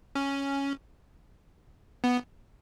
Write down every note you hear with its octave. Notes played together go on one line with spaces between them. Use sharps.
C#4
B3